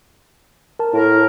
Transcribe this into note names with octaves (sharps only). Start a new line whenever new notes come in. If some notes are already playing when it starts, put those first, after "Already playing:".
A#4 A5
A2 E4 A#4